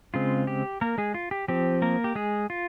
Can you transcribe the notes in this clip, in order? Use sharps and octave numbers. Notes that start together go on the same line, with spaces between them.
C#3 G#3 C4 F4
G4
A#3 A#4
G#3 G#4
F4
G4
F3 C4 G4
A#3 A#4
G4
G#3 G#4
F4